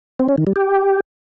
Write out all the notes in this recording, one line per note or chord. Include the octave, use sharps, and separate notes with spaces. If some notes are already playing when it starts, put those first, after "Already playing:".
C4
C#4
D#3
G3
G4